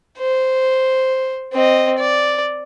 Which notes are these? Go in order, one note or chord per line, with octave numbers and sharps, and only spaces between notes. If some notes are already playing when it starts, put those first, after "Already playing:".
C5
C4 D#5
D5